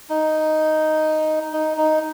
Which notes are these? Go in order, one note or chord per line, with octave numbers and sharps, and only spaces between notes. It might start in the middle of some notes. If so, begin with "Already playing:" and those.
D#4
D#4
D#4